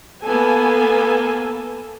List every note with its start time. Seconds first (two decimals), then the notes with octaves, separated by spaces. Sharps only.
0.24 A#3 B3 A4 G#5